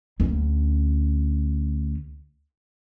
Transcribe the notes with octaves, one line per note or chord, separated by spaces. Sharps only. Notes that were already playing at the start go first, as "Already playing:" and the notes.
D2 C#4